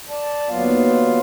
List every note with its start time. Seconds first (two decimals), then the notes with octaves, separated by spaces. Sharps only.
0.09 D5 A5
0.49 D#2 F#3 B3 F4 F5